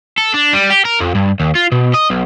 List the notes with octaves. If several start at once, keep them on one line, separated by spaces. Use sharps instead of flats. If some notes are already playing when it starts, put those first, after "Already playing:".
A4
D4
G3
G4
A#4
F2
G2
D#2
F4
B2
D#5
B1